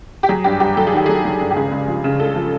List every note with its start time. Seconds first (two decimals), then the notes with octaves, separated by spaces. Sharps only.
0.23 G4
0.29 F#3 G#4
0.44 G2 G4
0.60 G2 G4
0.77 F#3 A4
0.87 G#4
0.93 D#3 G4
1.06 F#3 G#4
1.25 F#3
1.41 G2
1.51 G4
1.56 C#2 G#4
1.72 C#2
1.88 F3
2.04 C#3
2.20 C#2 A4
2.36 F3